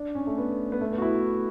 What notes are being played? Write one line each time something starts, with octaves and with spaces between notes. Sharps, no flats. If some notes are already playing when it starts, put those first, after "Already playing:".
Already playing: D4
C#4
A3
B3
B3
A3
B3
F#4
E4